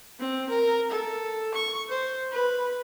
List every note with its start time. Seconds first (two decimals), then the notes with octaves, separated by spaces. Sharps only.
0.20 C4
0.49 A#4
0.91 A4
1.54 C#6
1.89 C5
2.32 B4